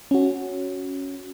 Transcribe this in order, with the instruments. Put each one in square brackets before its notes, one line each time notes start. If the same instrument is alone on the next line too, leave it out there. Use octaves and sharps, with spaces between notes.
[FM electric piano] C#4 F#4